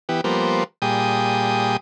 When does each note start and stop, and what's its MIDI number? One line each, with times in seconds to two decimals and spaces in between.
0.09 0.21 52
0.09 0.21 59
0.09 0.21 67
0.24 0.64 53
0.24 0.64 55
0.24 0.64 58
0.24 0.64 59
0.24 0.64 72
0.82 1.77 46
0.82 1.77 55
0.82 1.77 68
0.82 1.77 79
0.82 1.77 87